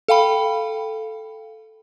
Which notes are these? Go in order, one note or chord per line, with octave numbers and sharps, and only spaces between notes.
A4 F5 G5 B5